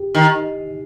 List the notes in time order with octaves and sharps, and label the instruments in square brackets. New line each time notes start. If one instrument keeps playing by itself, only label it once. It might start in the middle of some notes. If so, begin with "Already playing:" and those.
Already playing: [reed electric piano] G4
[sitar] D#3